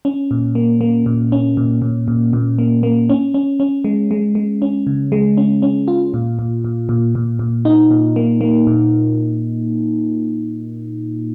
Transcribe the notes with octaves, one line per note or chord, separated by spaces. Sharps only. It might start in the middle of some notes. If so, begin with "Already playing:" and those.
C#4
A#2
A#3
A#3
A#2
C#4
A#2
A#2
A#2
A#2
A#3
A#3
C#4
C#4
C#4
G#3
G#3
G#3
C#4
C#3
G#3
C#4
C#4
F4
A#2
A#2
A#2
A#2
A#2
A#2
D#4
A#2
A#3
A#3
A#2